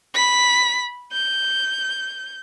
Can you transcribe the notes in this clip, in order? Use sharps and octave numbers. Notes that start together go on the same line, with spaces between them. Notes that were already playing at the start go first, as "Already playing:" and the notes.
B5 B6
G6